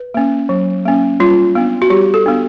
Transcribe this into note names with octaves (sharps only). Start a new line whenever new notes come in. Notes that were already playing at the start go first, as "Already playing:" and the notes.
Already playing: B4
A#3 C#4
F#3
A#3 C#4
G3 F4
B3 D4
F#4
G3 G4
A4
B3 D4